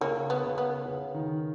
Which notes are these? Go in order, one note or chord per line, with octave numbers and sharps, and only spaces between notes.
C#3 A#3 C#4
B3
C#3
B3
C#3
D#3